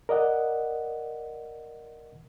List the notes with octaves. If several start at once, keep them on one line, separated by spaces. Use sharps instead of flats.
A#4 D5 D#5 F#5